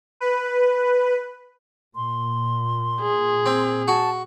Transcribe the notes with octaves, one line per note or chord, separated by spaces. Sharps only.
B4
A#2 C6
G#4
C4
F#4 A5